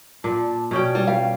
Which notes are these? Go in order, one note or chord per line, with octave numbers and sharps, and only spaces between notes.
A#2 A5
B2 C#4 D5 G5
G3
G3 F5 G5